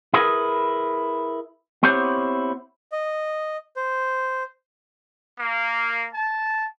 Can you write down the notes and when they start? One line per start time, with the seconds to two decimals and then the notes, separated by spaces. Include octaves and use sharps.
0.14 E4 G#4 A#4 B4
1.83 B3 C4 E4 G4 C5 C#5
2.92 D#5
3.76 C5
5.38 A#3
6.13 A5